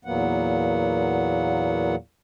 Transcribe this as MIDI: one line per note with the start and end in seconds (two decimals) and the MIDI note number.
0.05 1.95 40
0.05 1.95 46
0.05 1.95 54
0.05 1.95 58
0.05 1.95 59
0.05 1.95 78